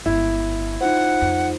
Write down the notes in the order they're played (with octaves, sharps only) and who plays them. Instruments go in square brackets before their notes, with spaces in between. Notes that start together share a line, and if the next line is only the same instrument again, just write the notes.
[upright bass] G1 G#3 [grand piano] E4
[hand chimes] D#4 F4 C5 [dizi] F#5
[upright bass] F2